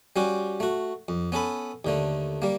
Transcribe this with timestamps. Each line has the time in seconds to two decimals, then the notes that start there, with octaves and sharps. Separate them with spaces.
0.16 G3 C#4 F#4 G4
0.60 A3 F#4
1.08 F2
1.32 B3 C#4 A4 B5
1.85 D#2 D3 A3
2.42 G3 A#3